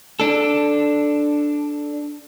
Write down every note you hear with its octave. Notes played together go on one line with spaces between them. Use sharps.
D4 A4